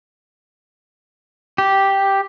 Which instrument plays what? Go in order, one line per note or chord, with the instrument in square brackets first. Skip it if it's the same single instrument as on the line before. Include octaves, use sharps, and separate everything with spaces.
[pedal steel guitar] G4